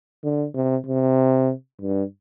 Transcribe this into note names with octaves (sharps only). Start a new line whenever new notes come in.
D3
C3
C3
G2